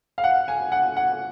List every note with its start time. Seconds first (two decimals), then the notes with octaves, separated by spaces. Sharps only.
0.18 F5
0.24 F#5
0.48 G#5
0.72 F#5
0.97 F#5